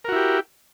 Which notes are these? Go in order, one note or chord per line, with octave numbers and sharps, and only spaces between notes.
E4 F#4 G4 A#4